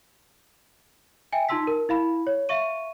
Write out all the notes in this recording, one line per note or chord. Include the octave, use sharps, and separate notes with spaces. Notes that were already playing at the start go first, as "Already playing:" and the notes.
E5 G5 G#5
D#4 F4 A5 C6 E6 B6
A#4
E4 F5 B5
C#5
E5 F5 C#6 D#7